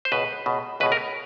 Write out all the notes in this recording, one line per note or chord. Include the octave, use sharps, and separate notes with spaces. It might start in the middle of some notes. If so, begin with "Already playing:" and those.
C5
C#2 B2 B4
C#2 B2
C#2 B2 B4
A#4